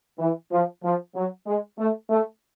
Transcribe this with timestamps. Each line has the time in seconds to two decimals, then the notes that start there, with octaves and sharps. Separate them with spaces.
0.19 E3
0.52 F3
0.83 F3
1.15 F#3
1.47 G#3
1.78 A3
2.10 A3